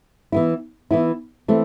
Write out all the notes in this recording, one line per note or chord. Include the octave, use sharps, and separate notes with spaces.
E3 B3 E4
E3 B3 E4
E3 A3 C4